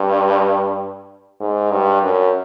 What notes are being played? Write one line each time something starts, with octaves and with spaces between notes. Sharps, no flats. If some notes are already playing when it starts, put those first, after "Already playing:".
Already playing: G2
G#2
G2
F#2